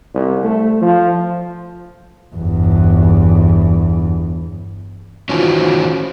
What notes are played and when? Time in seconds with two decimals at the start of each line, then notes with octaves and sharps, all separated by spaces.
0.15 C2
0.44 A3
0.82 F3
2.36 G1 E2
5.29 D#3 E3 C#4 F4 F#4 C5